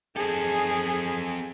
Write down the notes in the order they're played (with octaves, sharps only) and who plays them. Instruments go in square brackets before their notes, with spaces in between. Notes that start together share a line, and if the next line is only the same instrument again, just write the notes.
[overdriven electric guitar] C4 A4 [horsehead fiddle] G#4